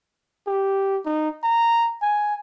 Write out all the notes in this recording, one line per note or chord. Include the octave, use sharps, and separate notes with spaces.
G4
D#4
A#5
G#5